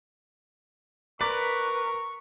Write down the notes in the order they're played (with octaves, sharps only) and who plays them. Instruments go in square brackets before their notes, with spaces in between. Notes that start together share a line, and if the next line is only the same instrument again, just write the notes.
[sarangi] A#4 [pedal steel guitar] B4 [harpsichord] D5 [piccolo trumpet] C#6